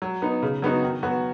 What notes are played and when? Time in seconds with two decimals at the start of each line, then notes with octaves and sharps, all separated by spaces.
0.02 F#3
0.22 B3 D#4
0.43 C#3
0.62 F#3 B3 D#4 F#4
0.82 D#3
1.03 F#3 B3 F#4